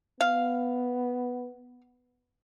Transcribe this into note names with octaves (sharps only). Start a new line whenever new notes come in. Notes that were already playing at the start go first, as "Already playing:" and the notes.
B3 F5